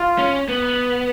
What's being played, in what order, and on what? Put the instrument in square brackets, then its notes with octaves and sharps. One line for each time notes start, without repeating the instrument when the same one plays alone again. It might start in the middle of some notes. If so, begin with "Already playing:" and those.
Already playing: [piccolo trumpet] F4
[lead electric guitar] C#4
B3